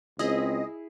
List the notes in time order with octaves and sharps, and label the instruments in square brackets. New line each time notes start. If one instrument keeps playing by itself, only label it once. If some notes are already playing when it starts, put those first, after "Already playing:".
[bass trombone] C#2 [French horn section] C4 [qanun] E4 G#4 [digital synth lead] D#5